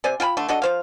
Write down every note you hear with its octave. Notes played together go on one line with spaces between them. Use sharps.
C3 C5 D5 G#5
F4 G5 G#5 B5
D3 A3
D4 F#4 A4 D#5
F3 C5 F5